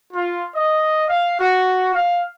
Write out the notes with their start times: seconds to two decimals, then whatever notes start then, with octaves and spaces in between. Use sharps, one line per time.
0.12 F4
0.53 D#5
1.07 F5
1.39 F#4
1.93 F5